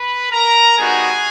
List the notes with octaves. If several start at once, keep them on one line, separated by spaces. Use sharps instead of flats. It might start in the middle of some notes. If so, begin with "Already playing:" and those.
Already playing: B4 B5
A#4 A#5
G3 B3 D#4 F#4 G#4 G#5